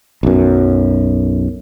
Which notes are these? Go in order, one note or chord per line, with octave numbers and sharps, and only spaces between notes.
B1 F#2